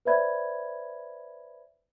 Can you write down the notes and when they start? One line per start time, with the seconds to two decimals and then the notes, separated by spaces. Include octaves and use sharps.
0.05 B4 C5 D5 E5 B5 G#6